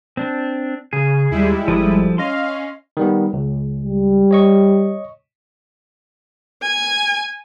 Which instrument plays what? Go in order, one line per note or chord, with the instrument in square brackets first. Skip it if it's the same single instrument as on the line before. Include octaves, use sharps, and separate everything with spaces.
[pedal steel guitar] C4 D4
[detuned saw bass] C#3 [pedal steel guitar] G#4
[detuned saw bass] D#2 [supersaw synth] G3 G#3 E4
[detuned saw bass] G#1 [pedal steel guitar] F3 A4 D#6
[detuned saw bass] C#4 [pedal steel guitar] D#5 C6 [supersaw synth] F5
[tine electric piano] D#3 G3 B3
C#2
[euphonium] G3
[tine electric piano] C#5 D#5 C#6
[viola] G#5